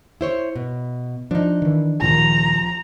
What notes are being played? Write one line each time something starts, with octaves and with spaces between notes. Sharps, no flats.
E4 C5 C#5
B2
F3 D4 D#4
D#3 E3
D2 A#2 D#3 F3 A#5